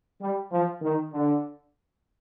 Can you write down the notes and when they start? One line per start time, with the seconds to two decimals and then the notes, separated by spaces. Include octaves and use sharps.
0.20 G3
0.51 F3
0.82 D#3
1.13 D3